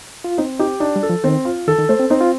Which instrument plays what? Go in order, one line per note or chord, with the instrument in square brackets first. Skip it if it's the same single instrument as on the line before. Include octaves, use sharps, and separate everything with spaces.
[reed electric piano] F4
[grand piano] C4 [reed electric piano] D#4
[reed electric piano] D#4 [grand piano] G4
[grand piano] D4 [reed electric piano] D#4
[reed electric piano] G3
[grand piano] A4
[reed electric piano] F3
[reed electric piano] D#3 [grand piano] C4
[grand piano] F4
[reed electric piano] D#3 [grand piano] A4
[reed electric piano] D#3
[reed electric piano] A3 [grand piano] C5
[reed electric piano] C4
[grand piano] C4 [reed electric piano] D#4
[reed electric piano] F4